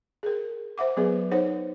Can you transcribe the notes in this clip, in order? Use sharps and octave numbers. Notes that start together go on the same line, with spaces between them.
G#4 A#4
C5 E5 F#5 D6
F#3 B3 G#4 B4
D#4 C5 C#5 F#5